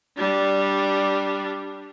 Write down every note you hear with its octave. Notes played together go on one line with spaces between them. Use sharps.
G3 D4